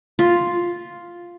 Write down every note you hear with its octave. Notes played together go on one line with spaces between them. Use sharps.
F4